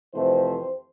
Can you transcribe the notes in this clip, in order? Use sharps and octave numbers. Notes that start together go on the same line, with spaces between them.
F2 C3 E3 A3 C4 C5